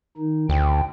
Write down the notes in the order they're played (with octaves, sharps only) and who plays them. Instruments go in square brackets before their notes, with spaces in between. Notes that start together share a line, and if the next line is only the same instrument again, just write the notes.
[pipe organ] D#3 D#4
[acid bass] D2 [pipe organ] G5